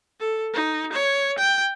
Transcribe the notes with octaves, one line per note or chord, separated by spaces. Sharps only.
A4
D#4
C#5
G5